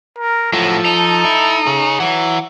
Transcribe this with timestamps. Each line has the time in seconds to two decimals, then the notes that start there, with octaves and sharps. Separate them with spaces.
0.19 A#4
0.53 A2 F3 F#3 A4
0.85 D#4
1.24 E4
1.67 G#4 C#5
2.00 E3 C#5 F#5